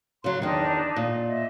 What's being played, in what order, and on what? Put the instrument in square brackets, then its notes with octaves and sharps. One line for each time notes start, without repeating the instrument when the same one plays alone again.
[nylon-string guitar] C#3 F#3 [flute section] C6
[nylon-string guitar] E2 D#3 [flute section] D4 D#4
[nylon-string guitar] A#2
[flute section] D#5 E5